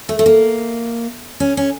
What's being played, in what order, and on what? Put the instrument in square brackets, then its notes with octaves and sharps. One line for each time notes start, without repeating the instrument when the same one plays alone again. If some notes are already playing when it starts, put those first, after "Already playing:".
[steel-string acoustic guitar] A3
A3
A#3
C#4
C#4